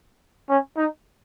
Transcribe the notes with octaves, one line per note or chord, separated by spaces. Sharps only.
C#4
D#4